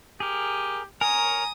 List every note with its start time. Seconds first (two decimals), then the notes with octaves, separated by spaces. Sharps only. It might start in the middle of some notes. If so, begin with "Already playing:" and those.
0.20 G4 G#4 A#4
1.01 A#4 C#5 G#5 A#5 D#6